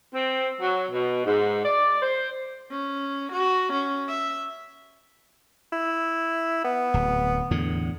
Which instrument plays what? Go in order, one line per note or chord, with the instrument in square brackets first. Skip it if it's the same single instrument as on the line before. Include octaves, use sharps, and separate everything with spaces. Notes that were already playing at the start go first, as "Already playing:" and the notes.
[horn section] C4
F#3
B2
G#2
D5
C5
[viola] C#4
F#4
C#4
E5
[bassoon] E4
B3
[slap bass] D1
E2 A2 D3